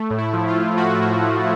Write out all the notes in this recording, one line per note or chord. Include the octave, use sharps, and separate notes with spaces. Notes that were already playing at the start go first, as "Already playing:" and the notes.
Already playing: A3
A2
E4
F3
F4
A2
A3 F#4
A2
F3